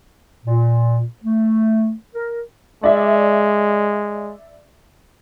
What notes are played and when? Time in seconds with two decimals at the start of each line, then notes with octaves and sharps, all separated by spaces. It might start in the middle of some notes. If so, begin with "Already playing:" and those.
0.45 A#2
1.23 A3
2.15 A#4
2.84 G#3 D5 E5